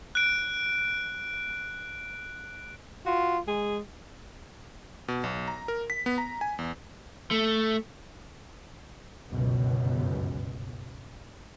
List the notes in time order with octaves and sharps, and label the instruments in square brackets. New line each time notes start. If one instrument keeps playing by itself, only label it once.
[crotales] F#6 D7
[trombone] F4 [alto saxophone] F#4
[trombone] G#3 [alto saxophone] G#4
[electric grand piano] B2
B1
A#5
A#4
B6
B3
A#5
G#5
E2
[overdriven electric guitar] A3
[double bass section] G1 C#2 F#2 B2